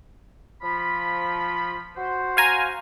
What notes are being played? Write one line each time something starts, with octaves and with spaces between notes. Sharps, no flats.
F3 B5
F#4 C5
F5 G#5 A#5